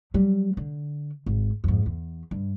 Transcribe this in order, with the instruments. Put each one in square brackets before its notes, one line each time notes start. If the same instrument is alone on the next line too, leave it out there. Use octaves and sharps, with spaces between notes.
[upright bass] F#3 G3
D3
G#1
F2 G#2
E2
G2